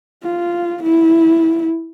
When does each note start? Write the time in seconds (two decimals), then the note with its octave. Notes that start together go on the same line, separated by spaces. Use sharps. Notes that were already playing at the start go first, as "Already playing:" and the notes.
0.23 F4
0.82 E4